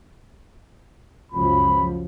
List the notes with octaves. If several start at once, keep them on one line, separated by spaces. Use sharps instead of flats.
C#2 F#2 F3 B5